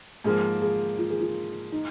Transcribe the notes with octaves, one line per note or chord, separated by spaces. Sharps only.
G#2 F3 A#3 G#4
G#4
F4
G#4
F4
D#4